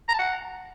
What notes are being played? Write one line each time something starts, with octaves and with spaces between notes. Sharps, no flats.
A#5
A5
F#5